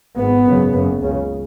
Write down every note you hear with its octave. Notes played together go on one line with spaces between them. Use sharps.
G#1 G#2 B3
G#1 F#2 C#3
F#1 F#2 C#3
C#2 C#3